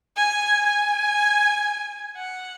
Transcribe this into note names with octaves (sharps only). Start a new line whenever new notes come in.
G#5
G#5
F#5